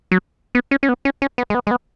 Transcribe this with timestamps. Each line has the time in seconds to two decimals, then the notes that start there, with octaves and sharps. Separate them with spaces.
0.11 F#3
0.55 B3
0.71 C#4
0.83 C#4
0.89 B3
1.05 C#4
1.22 C#4
1.38 B3
1.50 G#3
1.55 B3
1.67 G#3
1.71 B3